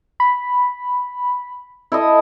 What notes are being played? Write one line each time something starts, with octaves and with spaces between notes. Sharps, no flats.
B5
E4 A4 D#5